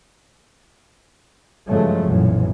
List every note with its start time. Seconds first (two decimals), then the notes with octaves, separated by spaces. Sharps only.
1.69 G2 C#3 F3 F#3 G#3 A3
2.05 B1 F#2 A#2 E3